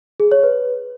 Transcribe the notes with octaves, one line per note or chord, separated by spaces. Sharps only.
G#4
C#5
B4